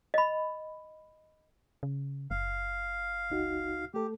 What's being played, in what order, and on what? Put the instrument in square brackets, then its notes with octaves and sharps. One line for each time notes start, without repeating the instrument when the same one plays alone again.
[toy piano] D#5 B5
[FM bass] C#3
[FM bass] F#1 [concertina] F5
[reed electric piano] C#2 D#4 F#4
[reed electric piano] A3 A4 [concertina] G4